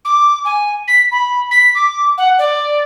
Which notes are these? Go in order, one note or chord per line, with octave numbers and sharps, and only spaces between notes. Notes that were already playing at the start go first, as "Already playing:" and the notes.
D6
G#5
B6
B5
B6
D6
F#5
D5